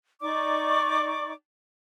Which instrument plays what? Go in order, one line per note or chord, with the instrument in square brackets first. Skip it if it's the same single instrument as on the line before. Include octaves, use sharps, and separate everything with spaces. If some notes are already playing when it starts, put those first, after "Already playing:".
[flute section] D#4 D5 C#6 D6